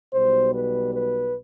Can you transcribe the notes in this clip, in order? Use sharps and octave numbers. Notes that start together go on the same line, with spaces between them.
B1 B2 G3 C5
B4
B4